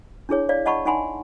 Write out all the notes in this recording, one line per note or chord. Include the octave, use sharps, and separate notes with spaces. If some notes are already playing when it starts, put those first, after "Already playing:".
D4 E4 G#4 C#5
C#5 D5 F5
D#5 F#5 A5 B5 C#6
D#4 F#5 G#5 B5 C6